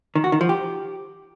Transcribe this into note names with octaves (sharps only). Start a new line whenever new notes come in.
D#3
F#4
D#3
F3
G4